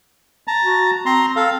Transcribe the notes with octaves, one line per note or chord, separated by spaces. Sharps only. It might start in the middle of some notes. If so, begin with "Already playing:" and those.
A5 A#5
F#4
C4 A#5 C6
A4 F5